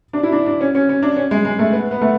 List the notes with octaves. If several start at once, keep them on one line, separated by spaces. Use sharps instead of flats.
D4
E4
D4
D4
C#4
C#4
C#4
D4
C#4
G#3
G#3
A3
B3
B3
A3